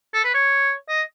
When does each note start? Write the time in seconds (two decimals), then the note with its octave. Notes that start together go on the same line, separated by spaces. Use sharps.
0.14 A4
0.24 B4
0.34 C#5
0.89 D#5